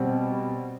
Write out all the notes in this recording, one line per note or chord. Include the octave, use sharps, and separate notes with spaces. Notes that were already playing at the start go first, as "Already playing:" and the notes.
Already playing: B2 G3 C4